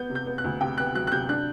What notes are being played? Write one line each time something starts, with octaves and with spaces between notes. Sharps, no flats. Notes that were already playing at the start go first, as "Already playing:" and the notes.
Already playing: B3 G6
C3
G6
B3
F#6
D2
C3 G5
B3 F#6
F#3 F#6
F#6
C3 G6
D4 F#6